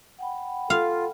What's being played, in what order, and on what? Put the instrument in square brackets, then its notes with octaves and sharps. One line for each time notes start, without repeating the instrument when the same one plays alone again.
[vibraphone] F#5 G5 B5
[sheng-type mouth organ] F4 [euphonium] A4 [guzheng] F5